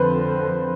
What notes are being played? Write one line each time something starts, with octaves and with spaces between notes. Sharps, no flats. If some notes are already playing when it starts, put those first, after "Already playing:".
Already playing: F2 D3 F3 C4 B4 C5